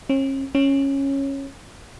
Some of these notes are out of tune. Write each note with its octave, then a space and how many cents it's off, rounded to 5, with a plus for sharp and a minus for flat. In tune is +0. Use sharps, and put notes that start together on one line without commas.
C#4 -40
C#4 -10